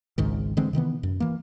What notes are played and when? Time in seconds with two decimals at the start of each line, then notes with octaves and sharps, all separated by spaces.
0.18 G#1 C#2 G#2 D#3
0.57 D3 E3 G#3 C4
0.73 C3 D#3 E3 B3
1.03 F#2
1.20 E3 A#3